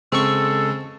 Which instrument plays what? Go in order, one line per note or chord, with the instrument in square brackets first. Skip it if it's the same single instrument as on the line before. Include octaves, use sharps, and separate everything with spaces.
[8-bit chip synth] C#3 G#3 [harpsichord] C4 C#6 [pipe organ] A4